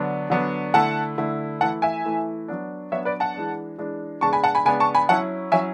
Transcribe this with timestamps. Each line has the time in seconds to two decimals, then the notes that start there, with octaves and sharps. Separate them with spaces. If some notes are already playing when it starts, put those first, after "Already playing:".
Already playing: D3 F#3 B3 D4
0.30 D3 F#3 B3 D4
0.74 D3 A3 E4 F#5 A5
1.18 D3 A3 E4
1.60 E3 A3 E4 F#5 A5
1.82 E5 G#5
2.05 E3 A3 E4
2.48 F#3 B3 D4
2.92 F#3 B3 D4 C#5 E5
3.05 B4 D5
3.20 F#5 A5
3.34 E3 G#3 D4
3.78 E3 G#3 D4
4.21 C#3 G#3 B3 D4 A5 C#6
4.33 G#5 B5
4.44 F#5 A5
4.55 G#5 B5
4.65 C#3 G#3 B3 D4 G#5 B5
4.80 A5 C#6
4.95 G#5 B5
5.09 F#3 C#4 E4 F#5 A5
5.52 F#3 C#4 E4 E5 G#5